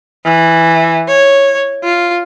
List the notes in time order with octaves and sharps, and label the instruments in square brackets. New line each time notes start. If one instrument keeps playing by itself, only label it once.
[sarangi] E3
C#5
F4